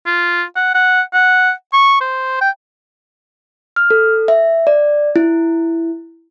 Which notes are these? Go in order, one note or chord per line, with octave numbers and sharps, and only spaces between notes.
F4
F#5
F#5
F#5
C#6
C5
G5
F6
A4
E5
D5
E4